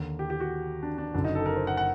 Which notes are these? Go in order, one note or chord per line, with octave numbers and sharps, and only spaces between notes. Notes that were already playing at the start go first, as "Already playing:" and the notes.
Already playing: D#2 D3
G4
G4
F#4
D4
D4
F#1 F#2 D3 D4
D#4
A4
A#4
C5
F#5
F#5